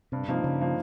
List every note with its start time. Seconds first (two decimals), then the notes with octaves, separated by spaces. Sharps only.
0.12 G2 C3
0.28 C3 F3 A#3 D#4
0.44 G2 C#3
0.60 F3 A#3 D#4